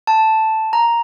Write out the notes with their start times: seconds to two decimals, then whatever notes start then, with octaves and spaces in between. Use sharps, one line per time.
0.07 A5
0.73 A#5